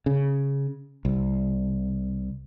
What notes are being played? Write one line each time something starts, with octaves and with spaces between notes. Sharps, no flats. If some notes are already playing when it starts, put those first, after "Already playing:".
C#3
C2